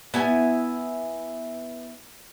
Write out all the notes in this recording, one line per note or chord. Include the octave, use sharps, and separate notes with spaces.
B3 E4 G#5